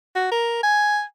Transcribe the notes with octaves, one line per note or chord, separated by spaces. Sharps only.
F#4
A#4
G#5